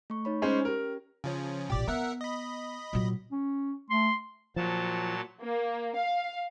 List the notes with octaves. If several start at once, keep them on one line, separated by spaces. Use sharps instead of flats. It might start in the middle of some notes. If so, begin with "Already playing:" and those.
A3 C#6
D#4 C#5 B5
G#3 C#4 C5
C#4 G4 A#4
C#3 F3 C#4
A1 A#2 G4 D5
B3 A#4 E5 F#5
D#5 B5
A#2 F#3
C#4
A3 C6
A#2 F3 F#3 A5
A#3
F5